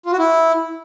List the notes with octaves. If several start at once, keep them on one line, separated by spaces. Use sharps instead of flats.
F4
F#4
E4